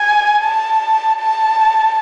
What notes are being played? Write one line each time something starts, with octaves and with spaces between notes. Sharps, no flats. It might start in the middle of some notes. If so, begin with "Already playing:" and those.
Already playing: G#5
A5
A5